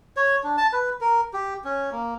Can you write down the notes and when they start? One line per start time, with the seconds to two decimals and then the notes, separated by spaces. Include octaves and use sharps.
0.16 C#5
0.44 D4
0.57 A5
0.73 B4
1.01 A#4
1.33 G4
1.64 C#4
1.92 A#3